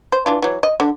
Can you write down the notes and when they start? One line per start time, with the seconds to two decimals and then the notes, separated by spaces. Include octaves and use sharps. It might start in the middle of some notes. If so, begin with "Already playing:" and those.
0.12 C5
0.26 E3 D4 F4
0.42 E3 F#3
0.63 D#5
0.80 D3